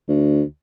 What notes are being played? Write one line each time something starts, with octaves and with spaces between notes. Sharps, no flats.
D2